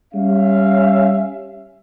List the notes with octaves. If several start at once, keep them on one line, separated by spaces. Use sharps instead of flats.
G3 C#4 E5 F5